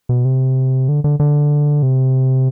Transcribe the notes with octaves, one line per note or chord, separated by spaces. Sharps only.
B2
C3
D3
D3
D3
C3